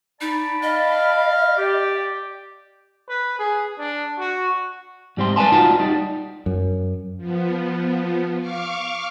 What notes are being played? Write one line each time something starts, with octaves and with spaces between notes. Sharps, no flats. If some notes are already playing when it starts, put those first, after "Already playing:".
D#4 D5 A5 B5
D#5 F5
G4 D5
B4
G#4
D4
F#4
G#2 G3 C4 C6
B4 D5 G#5 A5 C6
D#4 F4 F#4 D5 F#5 A5
G3 D#4 D5
F#2
F3 B3
F5 C#6 D6 F6